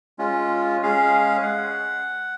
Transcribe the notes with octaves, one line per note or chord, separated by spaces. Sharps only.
G#3 C#4 F4
G#3 C#4 G#4 F5
F#5